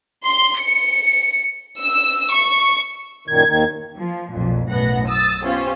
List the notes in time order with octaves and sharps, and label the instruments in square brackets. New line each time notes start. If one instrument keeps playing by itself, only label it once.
[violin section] C6
C#7
E6
C#6
[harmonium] F#2 A#2 D#3 [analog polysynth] G#6
[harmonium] D#2 D#3
[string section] F3
B1 F2 A#2
B1 F#2 A2 B3 F#5 A#6
D#6 E6 A6
B3 C#4 F4 G4 C5